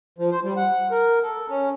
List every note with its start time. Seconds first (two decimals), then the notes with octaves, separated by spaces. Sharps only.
0.18 F3
0.32 C5
0.44 G3
0.57 F#5
0.91 A#4
1.23 A4
1.50 C#4